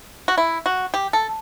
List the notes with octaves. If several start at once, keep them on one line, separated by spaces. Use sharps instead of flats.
F#4
E4
F#4
G4
A4